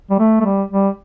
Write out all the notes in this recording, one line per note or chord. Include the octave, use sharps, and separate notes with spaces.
G3
A3
A3
G3
G3